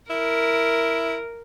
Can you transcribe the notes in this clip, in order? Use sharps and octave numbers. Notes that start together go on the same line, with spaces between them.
E4 A#4